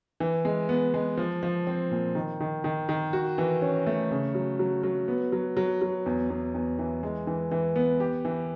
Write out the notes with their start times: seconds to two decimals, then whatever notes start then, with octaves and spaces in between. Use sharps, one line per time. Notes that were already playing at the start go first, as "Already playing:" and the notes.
0.20 E3
0.45 G#3
0.69 B3
0.94 G#3
1.17 F3
1.43 F3
1.67 C4
1.91 A#2
2.15 D#3
2.41 D#3
2.64 D#3
2.89 D#3
3.13 F#4
3.38 E3
3.62 C#4
3.86 A3
4.11 C#3
4.35 F#3
4.59 F#3
4.83 F#3
5.08 B3
5.32 F#3
5.57 F#3
5.82 F#3
6.06 E2
6.30 E2
6.54 E2
6.79 E3
7.03 G#3
7.27 E3
7.51 E3
7.76 B3
8.00 G4
8.25 E3